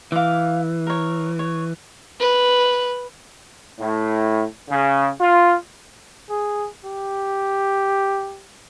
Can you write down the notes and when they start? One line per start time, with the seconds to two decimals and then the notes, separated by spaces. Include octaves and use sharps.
0.12 E3 F5 D6
0.87 A#4 C#5
1.39 C#5
2.20 B4
3.80 A2
4.70 C#3
5.20 F4
6.30 G#4
6.84 G4